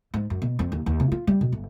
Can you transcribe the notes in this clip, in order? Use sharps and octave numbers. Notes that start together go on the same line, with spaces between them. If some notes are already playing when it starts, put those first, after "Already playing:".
G#2
F#2
B2
F2
D#2
D#2
C3
F4
G3
B2
G1